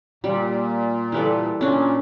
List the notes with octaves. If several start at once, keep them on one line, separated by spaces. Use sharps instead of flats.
A#2 G3
E3 G3 A4
A#2 C#4 D4